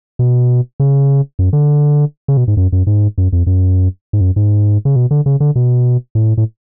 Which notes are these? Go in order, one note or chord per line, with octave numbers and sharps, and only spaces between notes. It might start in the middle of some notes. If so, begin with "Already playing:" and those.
B2
C#3
F#2
D3
C#3
B2
G#2
F#2
F#2
G#2
F#2
F2
F#2
G#2
F#2
G#2
C#3
B2
D3
C#3
D3
B2
A2
A2